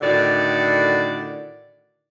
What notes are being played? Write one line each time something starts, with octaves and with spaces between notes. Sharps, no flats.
A2 D3 D#3 F#4 D5